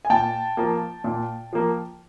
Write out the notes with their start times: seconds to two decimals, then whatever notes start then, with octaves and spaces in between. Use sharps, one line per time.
0.05 G#5
0.10 A#2 G5 A5
0.57 F3 A#3
1.04 A#2
1.53 F3 A#3